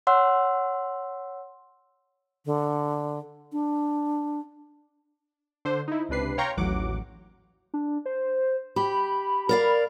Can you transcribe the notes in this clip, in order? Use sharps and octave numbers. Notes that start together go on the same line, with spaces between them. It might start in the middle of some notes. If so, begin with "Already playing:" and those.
C#5 F#5 C6 E6
D3
D4
D3 C5
D#4 E4
C#2 C3 D4 B4 C7
C#5 F5 G5 A#5 C6 C#6
A1 D#2 F#3 F#5 D6
D4
C5
G4 B5
A#4 D5 F5